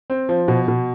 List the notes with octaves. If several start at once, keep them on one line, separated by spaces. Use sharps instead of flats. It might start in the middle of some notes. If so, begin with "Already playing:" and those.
C4
F3
B2
B2